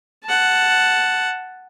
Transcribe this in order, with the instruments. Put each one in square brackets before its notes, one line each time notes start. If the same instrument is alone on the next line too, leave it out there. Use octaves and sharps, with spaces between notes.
[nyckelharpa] F#5 A5